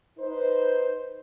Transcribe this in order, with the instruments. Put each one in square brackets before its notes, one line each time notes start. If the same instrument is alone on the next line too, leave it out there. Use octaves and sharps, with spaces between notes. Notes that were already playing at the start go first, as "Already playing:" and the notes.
[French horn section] D#4 B4 C5